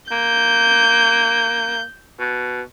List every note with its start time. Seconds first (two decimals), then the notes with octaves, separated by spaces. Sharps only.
0.11 A#3 G6
2.20 B2